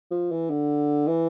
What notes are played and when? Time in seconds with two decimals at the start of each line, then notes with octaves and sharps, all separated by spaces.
0.11 F3
0.32 E3
0.50 D3
1.08 E3